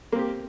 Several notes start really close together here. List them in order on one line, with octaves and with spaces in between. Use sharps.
A#3 C4 G4